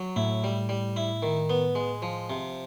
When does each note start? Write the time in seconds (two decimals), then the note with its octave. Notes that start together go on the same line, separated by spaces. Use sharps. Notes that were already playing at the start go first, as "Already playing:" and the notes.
Already playing: F#3
0.16 A2 E4
0.44 G3
0.69 G3
0.96 E4
1.23 D#3
1.50 B3
1.75 G#3
2.02 F3
2.30 C3